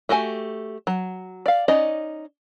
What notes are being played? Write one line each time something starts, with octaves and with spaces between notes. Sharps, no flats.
A3 F#4 G4 G#5
F#3
D5 F5
C#4 D#4 D5 D#5